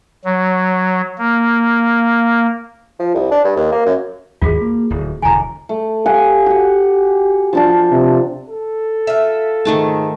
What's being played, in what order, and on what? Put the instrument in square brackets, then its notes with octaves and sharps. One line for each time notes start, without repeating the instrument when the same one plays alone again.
[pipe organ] F#3
A#3
[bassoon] F3
C2
D4
G2
D#2
A#3
F#2
[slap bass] D#2 G#2 [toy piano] F4 F#4 G#4
[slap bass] A#3
D1
[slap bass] E1 D3 [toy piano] G#5 A#5
[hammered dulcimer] A3
[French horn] G4 [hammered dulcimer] F5 F#5 G#5
[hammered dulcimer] F#4 F#5
F3 D4 A5
[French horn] C3
[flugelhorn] A4
[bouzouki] F4 E5
[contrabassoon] G#2 [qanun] D#3 A3 A5